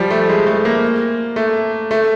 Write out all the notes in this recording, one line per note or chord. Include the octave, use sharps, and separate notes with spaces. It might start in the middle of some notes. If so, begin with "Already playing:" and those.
Already playing: F3 G3
A3
G#3
A3
A#3
A3
A3